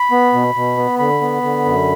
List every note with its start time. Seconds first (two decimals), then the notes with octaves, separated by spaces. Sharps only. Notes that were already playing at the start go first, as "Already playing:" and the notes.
Already playing: B5
0.11 B3
0.33 B2
0.55 B2
0.77 B3
0.99 D3 B5
1.21 B3
1.43 D3
1.65 F#2